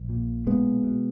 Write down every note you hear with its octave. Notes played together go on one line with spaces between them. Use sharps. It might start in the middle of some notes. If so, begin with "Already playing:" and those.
Already playing: A#1
A#2
B1 G#3 B3
B2